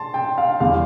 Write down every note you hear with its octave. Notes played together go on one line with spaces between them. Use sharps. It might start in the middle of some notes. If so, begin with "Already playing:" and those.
Already playing: A5 C6
G5
F5
E2 D3 G3 F5